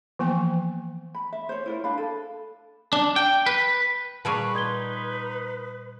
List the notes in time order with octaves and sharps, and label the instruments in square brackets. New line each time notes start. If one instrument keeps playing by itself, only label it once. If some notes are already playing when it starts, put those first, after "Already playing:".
[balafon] E3 F3 A#3 B3 G#5
[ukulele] B5
E5
C5 C#5
E4 F4 A#4
D4 F5 B5
A4
[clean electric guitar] D4
G5
B4
[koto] A#2 G3 G#4 [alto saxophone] B4 [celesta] A5 C#6
[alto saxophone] D#4 [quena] B4 [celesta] C6 G#6 G7